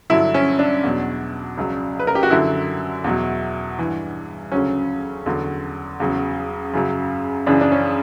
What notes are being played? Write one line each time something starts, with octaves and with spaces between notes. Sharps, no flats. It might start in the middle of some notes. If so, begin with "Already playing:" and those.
G2 D3 F#3 E4
C#4
D4
E2 B2 F#3
C#2 C#3 F#3
B4
A#4
G4
F#4
F#2 D3 F#3 E4
E2 B2 F#3
G2 E3
D2 C#3 F#3 C#4
E2 D3 F#3
E2 C#3 F#3
F#2 C#3 F#3
F#2 C#3 E3 D4
D4
C#4